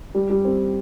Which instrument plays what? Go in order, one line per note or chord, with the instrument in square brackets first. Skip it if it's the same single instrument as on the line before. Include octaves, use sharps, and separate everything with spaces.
[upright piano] G3
G3
C4